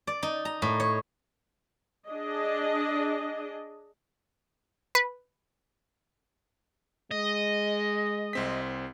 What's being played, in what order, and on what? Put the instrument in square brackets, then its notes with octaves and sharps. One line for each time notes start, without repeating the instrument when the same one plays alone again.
[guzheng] D5
D#4
A#5
A2
C#5
[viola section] D4 G#4 D#5
[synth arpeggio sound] B4
[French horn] G#3 [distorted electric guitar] D#5
[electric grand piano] C2 C4 B6